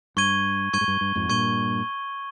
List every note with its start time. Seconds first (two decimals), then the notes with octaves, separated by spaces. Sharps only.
0.17 G2 C#6 G#6 D#7 G7
0.73 G2 C#6 G#6 D#7 G7
0.81 G#2
0.88 G2
1.01 G2
1.15 F2 G#2
1.29 G2 A#2 C#6 G#6 D#7 G7